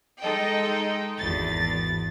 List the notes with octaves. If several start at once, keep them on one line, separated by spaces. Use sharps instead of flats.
G#3 D#4 A4 D#5 G5
G#1 E2 A6